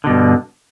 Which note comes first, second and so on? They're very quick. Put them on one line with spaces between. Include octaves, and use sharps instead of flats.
D3 B2 G2